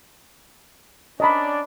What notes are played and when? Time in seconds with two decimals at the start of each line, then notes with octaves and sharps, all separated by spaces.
1.20 C#4 D4 D5 D#5 A#5 B5